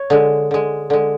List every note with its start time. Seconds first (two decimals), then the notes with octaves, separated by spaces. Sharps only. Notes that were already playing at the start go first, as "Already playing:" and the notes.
Already playing: C#5
0.10 D3 G#3
0.51 D3 G#3
0.90 D3 G#3